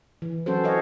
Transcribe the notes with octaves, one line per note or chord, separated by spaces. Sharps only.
E3
F#3 C#4 F#4 A4 C5
A4 C#5 D#5 F5